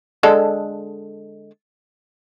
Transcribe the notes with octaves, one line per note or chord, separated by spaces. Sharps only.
D3 G#3 A4